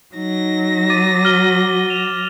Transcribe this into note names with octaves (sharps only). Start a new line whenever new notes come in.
F#3 D#4 A#6
D6 A6 D#7
F#4 F6 G7
E7 F7